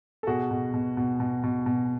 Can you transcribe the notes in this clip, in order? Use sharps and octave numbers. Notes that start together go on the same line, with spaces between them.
A4
B2 F#4 G#4
B2
B2
B2
B2
B2
B2